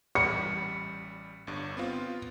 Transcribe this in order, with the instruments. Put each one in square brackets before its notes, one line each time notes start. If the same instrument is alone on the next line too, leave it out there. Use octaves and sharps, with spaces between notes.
[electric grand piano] A1 G3 B5 [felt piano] C#7
[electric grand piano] G1 G2
B3 C4 F4